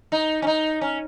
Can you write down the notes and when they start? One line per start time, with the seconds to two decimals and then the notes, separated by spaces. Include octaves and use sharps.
0.12 D#4
0.42 C#4
0.47 D#4
0.81 C#4